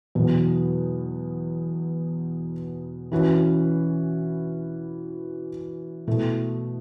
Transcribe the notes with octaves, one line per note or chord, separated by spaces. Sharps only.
E2 B2 F#3
E3 C#4 F#4 B4
B2 A3 E4